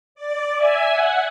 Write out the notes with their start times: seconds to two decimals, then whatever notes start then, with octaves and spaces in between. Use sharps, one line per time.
0.15 D5
0.56 E5 G#5
0.91 F#5